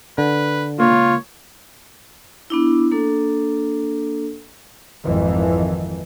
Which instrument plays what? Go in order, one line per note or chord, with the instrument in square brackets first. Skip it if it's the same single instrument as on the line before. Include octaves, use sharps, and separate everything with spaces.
[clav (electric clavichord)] D3 [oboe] B4
[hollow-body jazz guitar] C#2 A#2 A#3 [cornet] F4 [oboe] C#5
[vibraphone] B3 D4 E4
A#3 D4 A4
[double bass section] G#1 F2 D#3 E3